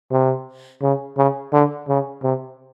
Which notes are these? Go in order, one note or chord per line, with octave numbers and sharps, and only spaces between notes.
C3
C#3
C#3
D3
C#3
C3